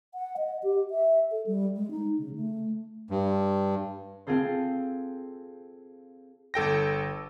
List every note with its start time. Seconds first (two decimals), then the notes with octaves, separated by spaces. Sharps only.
0.14 F#5
0.37 D#5
0.63 G4
0.91 E5
1.31 A4
1.46 G3
1.76 G#3
1.91 D#4
2.18 C#3
2.35 A3
3.10 G2
4.27 C4 F4 G#4 A4 C5
6.54 G1 A4 G5 A#6